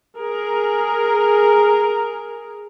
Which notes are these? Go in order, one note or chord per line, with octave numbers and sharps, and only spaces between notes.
G#4 A#4